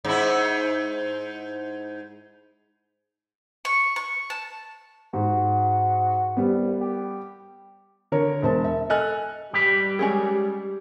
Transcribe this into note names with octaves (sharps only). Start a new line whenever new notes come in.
G#2 E4
C#6
C#6
A5
G#2 F#4
C2 G3 B3
G4
D3 A#4 C#5
E1 C5 A5
E5
A4 D#5 G#5 F6 F#6
G3 G4 B4
G#3 C#4 G#4